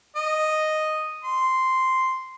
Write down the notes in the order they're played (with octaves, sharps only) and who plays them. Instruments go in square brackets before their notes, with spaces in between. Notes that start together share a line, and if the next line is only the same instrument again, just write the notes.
[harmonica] D#5
C6